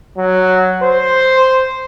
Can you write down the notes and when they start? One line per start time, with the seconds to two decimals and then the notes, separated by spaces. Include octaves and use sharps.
0.18 F#3
0.83 C5